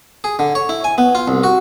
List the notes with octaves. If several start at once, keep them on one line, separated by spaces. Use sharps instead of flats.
G#4
D3
C#5
E4
G#5
B3
F4
C2
F#4